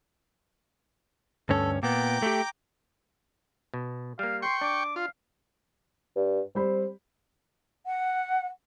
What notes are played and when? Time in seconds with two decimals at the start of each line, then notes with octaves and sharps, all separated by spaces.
1.49 D2 G2 C#4 A4
1.83 A#2 B3 G5 A#5 D6
2.22 A3 G4
3.74 B2
4.19 G3 A#3 F5
4.42 G5 C6 C#6
4.61 D4 D6
4.96 F4 F5
6.16 G2
6.55 G3 C4 C5 B5
7.86 F#5